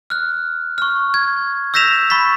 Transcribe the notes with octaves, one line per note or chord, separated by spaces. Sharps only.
F6 F#6
C#6 F6
G#6
E6 G6 A#6 B6 E7 F7
B5 C#6 A6 B6